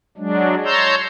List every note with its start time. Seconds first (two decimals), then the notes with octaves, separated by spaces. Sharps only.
0.18 F#3 G#3 D4
0.65 C#5 A5 A#5 C6 E6 G6